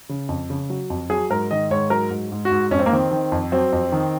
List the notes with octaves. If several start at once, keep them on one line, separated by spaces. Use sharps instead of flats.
C#3
F2
C#3
F#3
F2
F#3 G#4
G#2 A#4
D#3 D#5
G#2 C#5
F#3 A#4
G#2
G#2
F#4
G#2
F2 C#4
C4
A#3
D#3 C4
D#3
F2
F#3 C4
F2
D#3